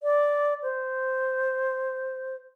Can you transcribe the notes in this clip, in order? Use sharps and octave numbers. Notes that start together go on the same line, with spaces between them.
D5
C5